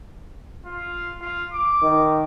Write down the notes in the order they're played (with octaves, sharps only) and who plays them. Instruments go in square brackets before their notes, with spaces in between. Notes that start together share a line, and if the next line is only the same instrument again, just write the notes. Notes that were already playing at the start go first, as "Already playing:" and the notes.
[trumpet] F4
F4
D6
[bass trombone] D#3